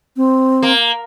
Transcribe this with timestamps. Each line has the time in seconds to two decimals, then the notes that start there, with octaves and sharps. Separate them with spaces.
0.17 C4
0.63 A#3